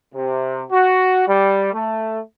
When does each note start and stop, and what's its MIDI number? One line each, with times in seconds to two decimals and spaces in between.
0.15 0.64 48
0.72 1.26 66
1.28 1.73 55
1.73 2.20 57